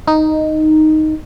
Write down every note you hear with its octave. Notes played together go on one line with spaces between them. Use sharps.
D#4